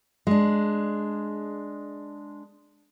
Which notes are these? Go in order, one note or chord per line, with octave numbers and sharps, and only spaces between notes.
G#3 D4